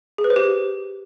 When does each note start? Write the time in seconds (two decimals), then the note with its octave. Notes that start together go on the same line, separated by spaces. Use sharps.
0.18 G#4
0.24 B4
0.30 C5
0.36 G4